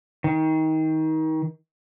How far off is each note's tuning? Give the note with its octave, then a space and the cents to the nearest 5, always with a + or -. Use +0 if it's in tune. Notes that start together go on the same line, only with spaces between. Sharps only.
D#3 +25